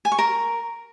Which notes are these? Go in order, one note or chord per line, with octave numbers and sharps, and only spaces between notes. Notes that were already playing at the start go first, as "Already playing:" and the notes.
G#5
C#6
A#4